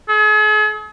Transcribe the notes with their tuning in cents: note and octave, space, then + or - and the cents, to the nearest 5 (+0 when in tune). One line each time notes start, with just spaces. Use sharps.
G#4 +45